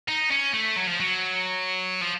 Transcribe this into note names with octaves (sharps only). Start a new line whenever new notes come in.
D#4
C#4
A3
F#3
F3
F#3
F3